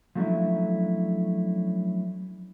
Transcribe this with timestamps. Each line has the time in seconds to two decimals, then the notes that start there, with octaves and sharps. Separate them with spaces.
0.15 F3 F#3 A3 C#4 D4 E4